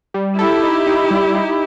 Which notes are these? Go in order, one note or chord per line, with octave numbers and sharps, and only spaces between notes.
G3
E4 G4 A4
D#4
D#4
G3
D#4